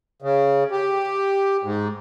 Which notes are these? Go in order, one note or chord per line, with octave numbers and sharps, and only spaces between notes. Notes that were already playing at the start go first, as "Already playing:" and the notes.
C#3
G4
G#2